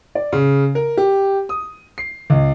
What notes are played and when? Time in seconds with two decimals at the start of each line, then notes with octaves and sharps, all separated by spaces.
0.15 D5
0.33 C#3
0.75 A#4
0.97 G4
1.49 D#6
1.98 C7
2.30 C#2